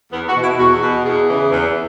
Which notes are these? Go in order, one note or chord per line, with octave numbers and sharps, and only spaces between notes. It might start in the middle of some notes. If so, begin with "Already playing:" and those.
E2 B3
F#4
B2
E4
E2 F#4
B2
E2 G#4
C#3 E3
E2